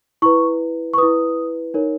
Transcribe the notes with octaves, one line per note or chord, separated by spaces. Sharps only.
E4 B4 C#6
C#6
E4 B4 D#6
D#4 A#4 C#5